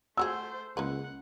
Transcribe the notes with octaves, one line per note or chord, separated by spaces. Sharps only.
A3 F4 F#4 G#4 C5 E6
C#2 G#3 A#3 B4 F#5